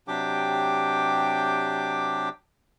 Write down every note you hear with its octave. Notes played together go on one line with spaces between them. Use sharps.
C3 F#3 D4 G4 G5 D6